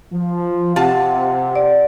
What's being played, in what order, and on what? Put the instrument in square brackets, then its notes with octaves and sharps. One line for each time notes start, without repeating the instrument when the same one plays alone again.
[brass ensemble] F3
[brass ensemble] C3 [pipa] F4 A5 [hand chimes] G4 F#5
[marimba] D5